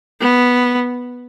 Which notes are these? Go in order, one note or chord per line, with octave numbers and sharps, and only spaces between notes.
B3